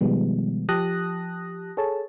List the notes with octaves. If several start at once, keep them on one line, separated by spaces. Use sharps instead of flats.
B2 D#3 F3 G3 G#3 B3
F3 G4 A5 D#6 F#6 A#6
G#4 A4 C#5 A5